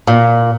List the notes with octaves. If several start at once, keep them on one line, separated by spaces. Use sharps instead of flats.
A#2